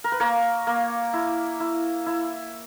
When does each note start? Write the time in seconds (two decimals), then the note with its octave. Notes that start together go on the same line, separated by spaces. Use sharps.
0.04 A#4
0.12 B4
0.20 A#3 A#4 C#5
0.67 A#3
1.13 E4
1.60 E4
2.06 E4